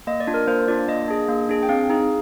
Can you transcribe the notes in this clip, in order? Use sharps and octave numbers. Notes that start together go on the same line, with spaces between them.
A#3 D#5
D5
D4 F4
A#4
A#3 C5
D4 F4 D5
A#3 D#5
D4 G#4
A#3
D4 G#4
G5
C4 F5
D#4 G#4